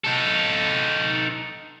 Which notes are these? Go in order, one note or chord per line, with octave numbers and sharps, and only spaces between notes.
D#4 A4